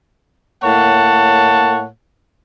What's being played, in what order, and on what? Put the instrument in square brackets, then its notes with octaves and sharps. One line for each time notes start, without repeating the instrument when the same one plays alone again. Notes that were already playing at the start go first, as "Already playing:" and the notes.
[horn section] A2 A#3 C#5 F#5 A5